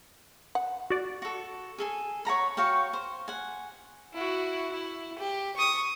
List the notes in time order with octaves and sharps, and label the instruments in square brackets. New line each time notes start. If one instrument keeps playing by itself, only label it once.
[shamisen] F#5
[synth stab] F#4 D5
[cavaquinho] F#4 A4
G#4 A4 G#5
C#5 F#5 A#5 B5
F#4 C#5 F5 G5
C5
F#5 G#5
[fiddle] E4 F#4
E4
G4
C#6 D#6